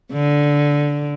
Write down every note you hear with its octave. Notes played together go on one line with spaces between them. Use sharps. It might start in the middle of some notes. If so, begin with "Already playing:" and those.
D3